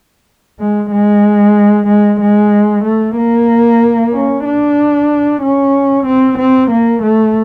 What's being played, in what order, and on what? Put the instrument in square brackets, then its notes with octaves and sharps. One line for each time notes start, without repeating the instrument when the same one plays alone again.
[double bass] G#3
G#3
G#3
G#3
A3
A#3
C#4
D4
C#4
C4
C4
A#3
A3